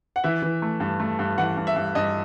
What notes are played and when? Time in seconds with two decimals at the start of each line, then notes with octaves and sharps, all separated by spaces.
0.16 F#5
0.24 E3 E5
0.42 E3
0.62 A3
0.80 G2
1.00 A3
1.19 G2
1.38 E3 F#5
1.57 G2
1.67 E5
1.76 G2
1.95 G2 D#5